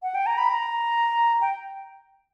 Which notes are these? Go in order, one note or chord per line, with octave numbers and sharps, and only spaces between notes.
F#5
G5
A#5
B5
A#5
G5